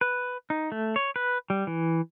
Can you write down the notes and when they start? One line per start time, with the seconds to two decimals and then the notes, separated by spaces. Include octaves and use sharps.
0.01 B4
0.50 D#4
0.72 A3
0.96 C#5
1.16 B4
1.50 G3
1.67 E3